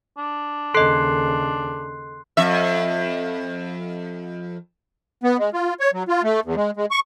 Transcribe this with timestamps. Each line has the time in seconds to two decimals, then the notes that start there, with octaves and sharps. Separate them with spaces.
0.18 D4
0.74 D#2 C#3 A4 D#5 C6 F#6 C7
2.37 F2 E5
5.24 B3
5.39 G#3
5.53 F4
5.80 C#5
5.93 F#3
6.08 F4
6.23 A3
6.45 E2
6.56 G#3
6.77 G#3
6.91 C#6